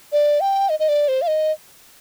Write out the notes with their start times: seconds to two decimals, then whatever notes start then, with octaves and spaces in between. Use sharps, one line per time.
0.12 D5
0.41 G5
0.69 D#5
0.80 D#5
0.89 D5
1.08 C5
1.22 F5
1.27 D#5